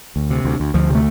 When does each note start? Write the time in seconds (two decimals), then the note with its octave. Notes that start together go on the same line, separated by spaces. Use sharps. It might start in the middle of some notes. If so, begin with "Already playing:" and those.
0.16 D2
0.30 C3
0.44 D2
0.60 D2
0.74 D2 F3
0.90 C3
0.95 A3